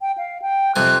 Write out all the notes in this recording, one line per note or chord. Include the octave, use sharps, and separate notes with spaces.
G5
F5
G5
F2 C3 G#5 F#6